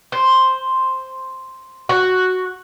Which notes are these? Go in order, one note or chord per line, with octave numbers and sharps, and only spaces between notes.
C5
F#4